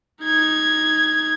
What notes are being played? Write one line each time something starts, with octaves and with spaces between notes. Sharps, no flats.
D#4 G#6